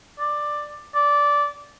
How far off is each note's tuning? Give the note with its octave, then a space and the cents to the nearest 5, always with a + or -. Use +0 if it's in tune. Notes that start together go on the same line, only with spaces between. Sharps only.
D5 +10
D5 -15